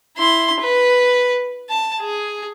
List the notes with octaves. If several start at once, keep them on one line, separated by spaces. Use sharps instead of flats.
E4 C6
B4
A5
G#4